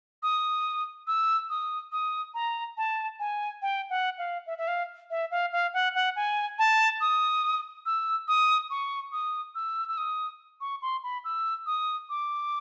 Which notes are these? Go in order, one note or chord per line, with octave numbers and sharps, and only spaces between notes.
D#6
E6
D#6
D#6
A#5
A5
G#5
G5
F#5
F5
E5
E5
F5
E5
F5
F5
F#5
F#5
G#5
A5
D#6
E6
D#6
C#6
D#6
E6
E6
D#6
C#6
C6
B5
E6
D#6
D6